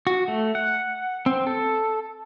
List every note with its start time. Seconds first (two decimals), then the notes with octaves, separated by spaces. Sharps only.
0.07 F#4
0.28 A3
0.55 F#5
1.26 C4
1.47 A4